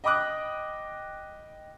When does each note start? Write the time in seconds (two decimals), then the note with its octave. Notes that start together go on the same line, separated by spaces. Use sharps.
0.04 D#5 G5 B5 D6 D#6 F#6